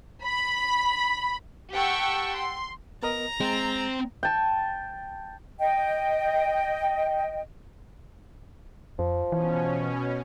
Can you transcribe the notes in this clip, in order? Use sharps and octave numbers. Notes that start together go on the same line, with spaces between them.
B5
G4 F#5 G5 A5 C#6 E6
C6
B3 A#4 D#5 A#5
G#3 C4 A6
G5 A5
D#5 G5
F2 F3
B2 E3 C#4